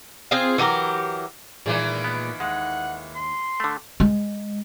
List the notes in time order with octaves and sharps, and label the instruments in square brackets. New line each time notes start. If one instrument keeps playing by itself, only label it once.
[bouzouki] C4 F4 G#4 F5
E3 F#3 G4 A#4
[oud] A#2 G#3 [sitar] D#3 E3 A#3
[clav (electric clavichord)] B3
[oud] D#2 [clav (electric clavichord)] G#3 [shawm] F#5
[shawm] C6
[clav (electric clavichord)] D3 A3
[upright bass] G#3